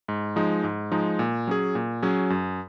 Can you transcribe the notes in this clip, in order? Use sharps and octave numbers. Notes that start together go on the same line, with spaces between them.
G#2
F3 G#3 D#4
G#2
F3 G#3 D#4
A#2
F#3 C#4 G#4
A#2
F#3 C#4 G#4
F#2